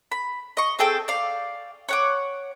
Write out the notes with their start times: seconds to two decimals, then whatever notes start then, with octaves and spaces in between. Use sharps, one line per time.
0.12 B5
0.57 D#5 C#6
0.79 C4 G#4 A4 G5
1.08 D5 F5
1.89 C#5 F#5 D6